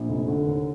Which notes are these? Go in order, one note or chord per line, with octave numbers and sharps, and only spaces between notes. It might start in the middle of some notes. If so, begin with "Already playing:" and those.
Already playing: A#1
F1
D3
D#2